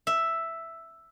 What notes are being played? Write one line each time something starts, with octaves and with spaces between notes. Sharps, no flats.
E5